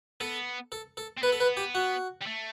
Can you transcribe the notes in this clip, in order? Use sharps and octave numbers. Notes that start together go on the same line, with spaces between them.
B3 A4
A4
A4
C4
B3 B4
A4
B4
G4
F#4
G3
A3